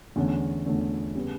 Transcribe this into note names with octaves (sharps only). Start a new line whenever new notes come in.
E2 D3 A3 C#4
E2 D3 A3 C#4
C#3 G3 B3